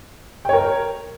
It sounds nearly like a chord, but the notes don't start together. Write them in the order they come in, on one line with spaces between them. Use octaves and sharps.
G5 C#5 A#4